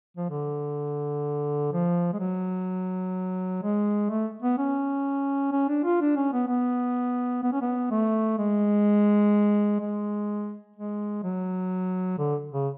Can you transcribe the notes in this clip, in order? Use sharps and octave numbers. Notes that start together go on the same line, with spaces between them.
F3
D3
F3
G#3
F#3
G#3
A3
B3
C#4
C#4
D4
F4
D4
C#4
B3
B3
B3
C#4
B3
A3
G#3
G#3
G#3
F#3
D3
C#3